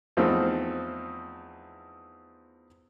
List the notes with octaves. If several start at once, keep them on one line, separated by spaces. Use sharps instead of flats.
E2 F3 A3 C4 D#4 F6